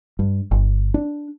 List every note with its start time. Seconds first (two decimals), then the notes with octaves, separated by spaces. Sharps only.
0.19 G2
0.51 G1
0.94 D4